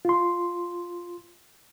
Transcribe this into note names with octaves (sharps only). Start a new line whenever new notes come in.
F4 C6